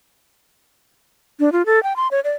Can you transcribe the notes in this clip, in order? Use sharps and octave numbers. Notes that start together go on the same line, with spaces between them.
D4
F4
A4
G5
C6
C#5
D5